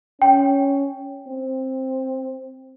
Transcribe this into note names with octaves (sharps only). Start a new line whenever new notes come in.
C#4 G5
C4